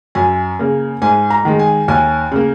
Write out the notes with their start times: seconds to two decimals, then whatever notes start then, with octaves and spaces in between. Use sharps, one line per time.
0.15 F#2 G#5
0.59 C#3 A#3
1.02 G#2 G#5
1.30 A#5
1.45 D#3 G#3
1.59 G#5
1.88 D#2 G#5
2.32 C#3 A#3